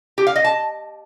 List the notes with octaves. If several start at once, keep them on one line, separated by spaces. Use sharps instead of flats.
G4
F5
D#5
A5